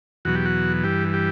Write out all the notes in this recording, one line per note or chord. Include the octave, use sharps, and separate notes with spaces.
E2 B2 F#3 F#4
G4
F#4
G2 E3 G4
G4